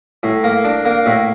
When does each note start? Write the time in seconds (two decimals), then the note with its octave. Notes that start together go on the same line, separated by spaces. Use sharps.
0.23 A2
0.43 A#3
0.65 D4
0.85 A#3
1.06 A2